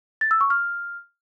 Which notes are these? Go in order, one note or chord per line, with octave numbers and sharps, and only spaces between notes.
A6
E6
C#6
F6